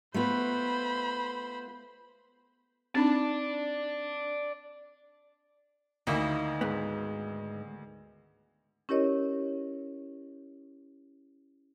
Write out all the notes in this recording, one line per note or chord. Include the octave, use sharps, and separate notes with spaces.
A3 B3 F4 C5 B5
C4 D4 D#4 D5 A5
D2 D#3 A#3 D#4 E4
G#2 B3
C#4 E4 G4 A#4 C#5 D#5